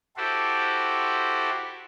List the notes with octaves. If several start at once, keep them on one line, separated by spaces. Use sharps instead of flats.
E4 F#4 G4 A4 C5